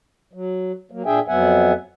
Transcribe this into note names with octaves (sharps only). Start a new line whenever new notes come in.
F#3
F#3 A#3
A#2 D4 G#4 E5 G5 G#5
F2 F#3 B3 E5 F#5 G#5